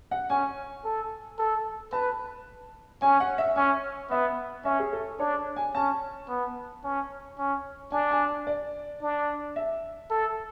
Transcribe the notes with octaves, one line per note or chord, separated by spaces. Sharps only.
F#5
C#4 G#5
A4
A4
B4 A5
C#4 G#5
F#5
E5
C#4 G#5
B3 E5
C#4 E5
G#4
A4
D4 C#5
G#5
C#4 A5
B3
C#4
C#4
D4 G#5
G#5
D5
D4
E5
A4